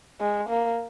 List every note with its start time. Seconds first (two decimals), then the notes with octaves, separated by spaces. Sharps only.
0.21 G#3
0.49 A#3